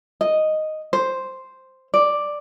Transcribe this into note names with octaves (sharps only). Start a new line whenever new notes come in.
D#5
C5
D5